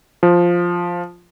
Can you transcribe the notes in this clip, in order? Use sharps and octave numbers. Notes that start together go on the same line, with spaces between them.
F3